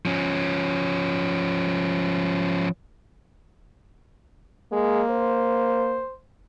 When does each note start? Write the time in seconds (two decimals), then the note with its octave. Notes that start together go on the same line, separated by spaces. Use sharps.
0.06 F3 C#4
4.72 G#3 A#3
5.11 C5